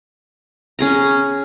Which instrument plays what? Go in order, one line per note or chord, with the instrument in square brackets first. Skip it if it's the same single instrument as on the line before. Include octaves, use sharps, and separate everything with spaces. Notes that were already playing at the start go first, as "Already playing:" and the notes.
[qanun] C#4 G#4 A#5